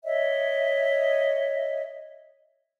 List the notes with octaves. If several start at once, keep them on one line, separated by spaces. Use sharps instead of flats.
C#5 D#5 E5